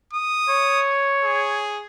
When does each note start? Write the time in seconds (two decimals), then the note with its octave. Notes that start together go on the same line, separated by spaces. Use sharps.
0.14 D#6
0.49 C#5
1.24 G#4